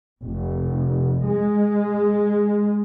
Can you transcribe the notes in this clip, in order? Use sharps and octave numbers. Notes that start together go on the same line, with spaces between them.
F1
G#3